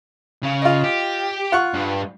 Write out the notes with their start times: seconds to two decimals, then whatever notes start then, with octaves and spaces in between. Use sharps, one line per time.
0.43 C#3
0.62 F4 D#5
0.84 G4
1.52 F4 F#5 C#6
1.74 G2